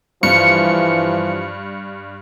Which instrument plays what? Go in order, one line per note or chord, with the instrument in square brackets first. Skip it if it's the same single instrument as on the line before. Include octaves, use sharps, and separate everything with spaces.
[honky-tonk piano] G2 [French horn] E3 [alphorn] F3 [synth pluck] C#7